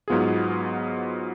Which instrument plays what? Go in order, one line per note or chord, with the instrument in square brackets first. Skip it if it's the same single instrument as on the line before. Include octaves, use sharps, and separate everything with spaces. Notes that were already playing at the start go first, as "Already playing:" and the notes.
[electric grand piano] G#2 F#3 B3 F4 G#4